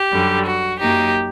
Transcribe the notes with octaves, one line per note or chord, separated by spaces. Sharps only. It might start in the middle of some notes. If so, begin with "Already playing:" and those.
Already playing: G4
F#2 D3 G3
F#4
F#2 F#3 A#3 D#4 G4